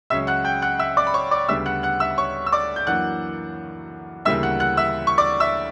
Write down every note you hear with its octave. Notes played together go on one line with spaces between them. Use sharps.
C#2 C#3 F#3 C#4 E5 E6
F#5 F#6
G5 G6
F#5 F#6
E5 E6
D5 D6
B5
C#5 C#6
D5 D6
D2 C#3 G3 B3 D4 E5 E6
F#5 F#6
F#5 F#6
E5 E6
C#5 C#6
E6
D5 D6
G6
F#2 E3 A#3 D4 F#5 F#6
D2 C#3 E3 G3 A#3 E5 E6
F#5 F#6
F#5 F#6
E5 E6
C#6
D5 D6
E5 E6